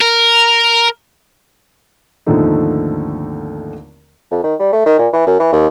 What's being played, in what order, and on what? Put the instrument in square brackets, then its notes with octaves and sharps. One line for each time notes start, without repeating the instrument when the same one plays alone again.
[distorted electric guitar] A#4
[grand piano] G#1 D#2 D3 F3 A3 D#4
[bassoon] F2
D#3
G3
A3
D#3
A#2
E3
F#2
E3
D#2